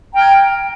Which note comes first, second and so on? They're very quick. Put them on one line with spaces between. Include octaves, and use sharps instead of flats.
A#5 G5 F6 G#6